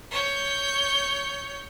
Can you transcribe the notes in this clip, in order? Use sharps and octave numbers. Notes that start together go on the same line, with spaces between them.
C#5 G6